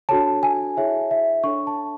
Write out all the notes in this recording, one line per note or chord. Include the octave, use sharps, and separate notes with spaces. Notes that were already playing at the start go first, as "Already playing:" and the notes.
D4 F#4 A4 C#5 A5
G#5
E4 G#4 C#5 E5
E5
D4 A4 C#5 C#6
A5